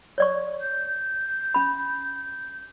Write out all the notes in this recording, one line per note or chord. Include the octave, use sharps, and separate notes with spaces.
C#5 D5 C#6
G6
C#4 B5